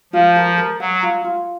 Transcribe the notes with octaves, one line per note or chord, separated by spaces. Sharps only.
F3 F4
A#4
A#4
F#3 F#5
F4
F4